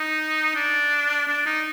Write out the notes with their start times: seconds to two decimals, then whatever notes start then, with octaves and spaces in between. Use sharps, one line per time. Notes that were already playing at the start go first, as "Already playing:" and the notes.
Already playing: D#4
0.56 D4
1.28 D4
1.46 D#4